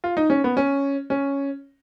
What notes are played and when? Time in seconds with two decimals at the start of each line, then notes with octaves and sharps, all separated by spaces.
0.04 F4
0.17 D#4
0.30 C#4
0.44 B3
0.57 C#4
1.10 C#4